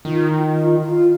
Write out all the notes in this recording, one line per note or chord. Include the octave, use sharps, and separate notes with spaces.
D#3 F4
F4
F4